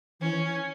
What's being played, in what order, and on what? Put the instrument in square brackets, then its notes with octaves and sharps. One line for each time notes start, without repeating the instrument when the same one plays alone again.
[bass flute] E3 [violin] C#4